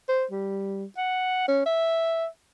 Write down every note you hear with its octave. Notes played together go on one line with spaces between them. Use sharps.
C5
G3
F#5
C#4
E5